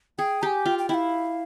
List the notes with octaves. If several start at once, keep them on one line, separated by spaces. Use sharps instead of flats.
G#4 G5
G4 G#5 A#5
F4 G5
G5
E4 F5 G5